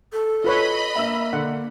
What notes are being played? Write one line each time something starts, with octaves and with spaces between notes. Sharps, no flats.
A4
F4 B4 C#5 D#5 B5
A#3 E5 E6
D3 F#5